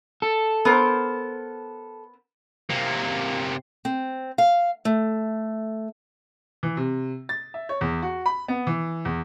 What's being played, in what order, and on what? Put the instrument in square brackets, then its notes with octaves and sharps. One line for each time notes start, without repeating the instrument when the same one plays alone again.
[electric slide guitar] A4
[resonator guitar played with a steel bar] B3 A#4 C5
[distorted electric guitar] C3 A#3
[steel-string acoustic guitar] C4
F5
A3
[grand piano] E3
C3
A6
E5
C#5
E2
F#4
B5
B3
E3
E2